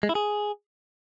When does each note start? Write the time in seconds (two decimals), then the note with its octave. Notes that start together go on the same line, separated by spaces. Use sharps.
0.03 G#3
0.09 E4
0.15 G#4